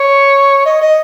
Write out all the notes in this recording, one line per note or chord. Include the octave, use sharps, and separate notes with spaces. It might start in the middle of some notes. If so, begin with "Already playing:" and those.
Already playing: C#5
D#5
D#5